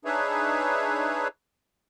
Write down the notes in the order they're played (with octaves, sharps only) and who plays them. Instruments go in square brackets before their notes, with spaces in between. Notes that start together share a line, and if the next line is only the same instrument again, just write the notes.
[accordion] D4 D#4 G#4 B4 C#5 E5